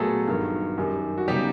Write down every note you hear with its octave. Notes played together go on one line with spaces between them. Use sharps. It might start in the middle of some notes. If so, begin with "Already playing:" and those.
Already playing: A#2 F#3 A3 B3 G#4 A4
G2 D#3 F#3
F#2 D#3 G3
F#4
C#3 F#3 G3 B3 D#4 G4